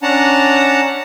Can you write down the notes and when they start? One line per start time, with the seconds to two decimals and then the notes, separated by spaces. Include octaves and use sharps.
0.03 C#4 D4 F#5 A5 A#5